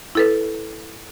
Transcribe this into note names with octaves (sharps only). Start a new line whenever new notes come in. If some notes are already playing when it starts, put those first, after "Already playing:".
E4 A4 B4